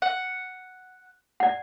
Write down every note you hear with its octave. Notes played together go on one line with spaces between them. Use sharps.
F#5
D5 F#5